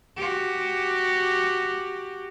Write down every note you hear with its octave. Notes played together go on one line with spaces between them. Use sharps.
F#4 G4